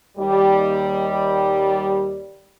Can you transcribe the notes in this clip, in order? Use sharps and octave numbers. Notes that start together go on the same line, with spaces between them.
D#2 G3